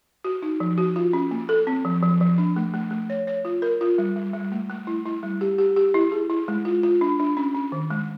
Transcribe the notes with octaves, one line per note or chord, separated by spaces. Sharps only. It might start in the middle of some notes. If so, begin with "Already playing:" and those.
F#4
D#4
F3
F#4
F4
C#4
A#3
A4
C4
F3
F3
F3
D4
A3
A3
A3
C#5
C#5
F4
A#4
F4
G3
G3
G3
A3
A3
E4
E4
G3
G4
G4
G4
E4
G#4
E4
G#3
F4
F4
D4
D4
C#4
C#4
D#3
G#3